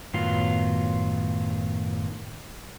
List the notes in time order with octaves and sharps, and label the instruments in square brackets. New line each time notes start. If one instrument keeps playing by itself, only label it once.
[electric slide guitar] F#2 A2 D#3 F#3 B3 F4